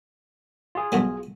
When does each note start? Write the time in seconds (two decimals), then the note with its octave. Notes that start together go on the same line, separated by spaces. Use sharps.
0.75 F4 G#4
0.92 B1 G2 F#3